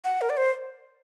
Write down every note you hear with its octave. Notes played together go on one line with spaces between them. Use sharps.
F#5
A#4
D5
C5